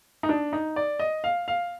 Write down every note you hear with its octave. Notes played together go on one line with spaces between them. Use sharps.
D#4
D4
D#4
D5
D#5
F5
F5